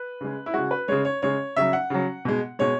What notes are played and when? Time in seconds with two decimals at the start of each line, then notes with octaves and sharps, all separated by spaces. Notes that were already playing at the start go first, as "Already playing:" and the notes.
Already playing: B4
0.21 C#3 G#3
0.46 E4
0.54 C#3 G#3 F#4
0.71 B4
0.88 C#3 G#3 C#5
1.05 C#5
1.22 C#3 G#3 C#5
1.56 C#3 F#3 E5
1.73 F#5
1.90 C#3 F#3
2.25 B2 G#3
2.59 B2 G#3 C#5